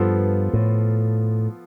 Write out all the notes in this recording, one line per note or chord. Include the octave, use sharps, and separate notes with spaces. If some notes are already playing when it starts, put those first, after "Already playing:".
Already playing: G2 F3 B3 F4 A4
A2